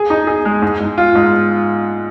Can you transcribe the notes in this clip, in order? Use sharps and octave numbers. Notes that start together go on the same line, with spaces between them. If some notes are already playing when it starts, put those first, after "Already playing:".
Already playing: G#4
D#4
G#4
G#3
G#2
G#2
F4
G#2